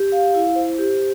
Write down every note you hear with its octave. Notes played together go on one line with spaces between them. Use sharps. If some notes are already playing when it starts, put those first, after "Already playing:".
Already playing: G4
F5
E4
C5
G4